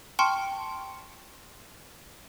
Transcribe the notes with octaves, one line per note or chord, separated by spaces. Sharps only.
G5 A5 C6 C#6 F6 C#7